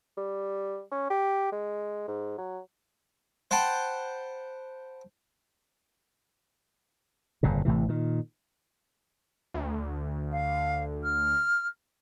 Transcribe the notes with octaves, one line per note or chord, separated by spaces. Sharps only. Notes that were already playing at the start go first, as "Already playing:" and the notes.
G3
C#4
G4
G#3
G#2
F#3
C5 F#5 G5 A5 B5
G1 F2 A#2 C#3
A1 A2 C3 E3
A#2 D#3
D2
F5
F6